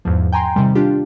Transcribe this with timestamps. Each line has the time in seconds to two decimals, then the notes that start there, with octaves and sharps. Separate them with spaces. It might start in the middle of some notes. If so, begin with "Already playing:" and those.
0.05 E2 G#2 F3
0.32 G5 G#5 A#5 C6
0.56 C3 D#3 G3
0.75 D4 F4 G4